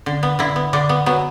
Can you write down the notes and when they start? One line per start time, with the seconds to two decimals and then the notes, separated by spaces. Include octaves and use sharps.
0.06 D3
0.23 B3
0.39 D3 E4
0.56 B3
0.73 D3 D4
0.89 B3
1.06 F#3 B3